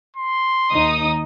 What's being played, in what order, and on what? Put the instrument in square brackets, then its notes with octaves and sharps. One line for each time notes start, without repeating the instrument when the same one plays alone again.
[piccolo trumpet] C6
[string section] D#2 D#4 D#6